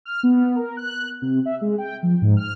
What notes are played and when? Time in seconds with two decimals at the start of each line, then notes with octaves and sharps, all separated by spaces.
0.05 F6
0.23 B3
0.56 A#4
0.77 F#6
1.22 C3
1.45 E5
1.61 G#3
1.78 G5
2.03 F3
2.22 G#2
2.37 F6